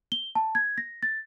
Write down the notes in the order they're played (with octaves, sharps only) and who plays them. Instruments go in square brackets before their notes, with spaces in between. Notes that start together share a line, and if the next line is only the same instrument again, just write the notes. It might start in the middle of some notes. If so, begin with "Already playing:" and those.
[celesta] G7
A5
G#6
A#6
A6